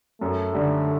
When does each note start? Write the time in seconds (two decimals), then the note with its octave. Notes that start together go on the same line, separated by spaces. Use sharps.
0.21 F#2 A3
0.53 D3 G3